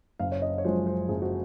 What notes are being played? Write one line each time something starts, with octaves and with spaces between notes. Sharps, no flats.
F#1 F5
C#5
D#5
C#5
F#2 F3 G#3 C5
C5
F#1 G#4
F#4